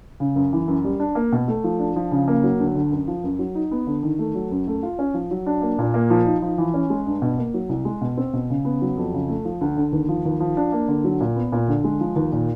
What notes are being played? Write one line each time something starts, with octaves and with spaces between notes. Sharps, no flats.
C#3
F#2
E3
F#2
G3
D4
A#3
B2
A3
F3
D4
F3
C#3
A#3
F#3
D2
D3
F#2
F3
F#2
F#3
D#4
B3
D3
D#3
A3
F#3
F#2
A3
F4
C#4
F3
F#3
D4
A#3
A#2
A#3
F3
D#4
F3
E3
C#4
G#3
G2
B2
A#3
F#3
C2
G#3
B2
C4
B2
C#3
B3
F#3
F2
C#3
A3
F3
D2
D3
D#2
F3
D#2
F3
D4
A#3
D3
F#3
A#2
B3
A#2
D3
G#3
F3
D#2
A#2